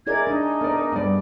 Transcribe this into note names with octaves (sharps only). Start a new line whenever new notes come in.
E4 G#4 A#4 D5 D#5 G#6
D4 D#4
B3 A#4 D5
G2 G3 B3 D5